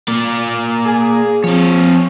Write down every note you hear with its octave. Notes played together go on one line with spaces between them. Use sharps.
A#3 D5
G#4
F3 C4 C#5